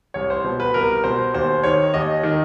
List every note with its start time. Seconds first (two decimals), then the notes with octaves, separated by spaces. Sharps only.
0.14 C2 C#5
0.30 C5
0.44 B2
0.60 B4
0.74 C2 A#4
1.04 B2 C5
1.34 D#2 C5
1.63 D#3 C#5
1.94 D#2 D#5
2.23 D#3